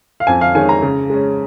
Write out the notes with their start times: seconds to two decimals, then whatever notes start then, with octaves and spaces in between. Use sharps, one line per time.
0.20 F5
0.27 F2 G#5
0.41 F5
0.55 D#3 G#3 C#4 G#5
0.69 A#5
0.82 C#3
1.10 G#3 C#4